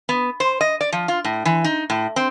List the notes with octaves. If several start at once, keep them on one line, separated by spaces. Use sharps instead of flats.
B3
C5
D#5
D5
F3
F4
A2
E3
D#4
A2
C4